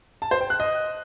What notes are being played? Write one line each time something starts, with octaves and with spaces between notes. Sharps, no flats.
A5
C5
G5
F#6
D#5